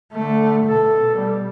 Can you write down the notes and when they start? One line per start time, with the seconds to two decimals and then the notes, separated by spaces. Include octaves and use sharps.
0.13 D3 A3
0.66 B2 A4
1.14 G3